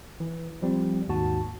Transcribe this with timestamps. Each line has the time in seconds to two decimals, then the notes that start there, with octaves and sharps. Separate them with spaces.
0.20 E3
0.62 F3 G3 C4
1.08 D#2 G#2 F#4 A5